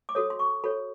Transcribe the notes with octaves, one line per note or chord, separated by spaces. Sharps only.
D6
F#4 A4 C#5 D#6
C6
C#6
F#4 A4 C#5 B5